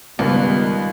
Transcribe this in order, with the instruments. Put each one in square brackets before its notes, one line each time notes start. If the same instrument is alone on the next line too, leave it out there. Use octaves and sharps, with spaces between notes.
[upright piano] C#2 [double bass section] D#3 G3 B3